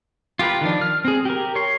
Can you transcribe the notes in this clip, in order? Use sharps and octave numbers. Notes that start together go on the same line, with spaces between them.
F4 G4 A#4 B4
D#3 F3 D4
F6
C4 G#4
G4 A#4
C#5 C6